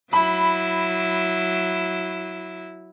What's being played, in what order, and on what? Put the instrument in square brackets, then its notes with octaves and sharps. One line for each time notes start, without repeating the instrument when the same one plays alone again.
[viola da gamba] F#3 E4 [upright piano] B5